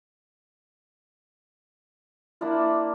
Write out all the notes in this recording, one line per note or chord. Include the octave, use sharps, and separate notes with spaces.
A#3 D4 E4 F4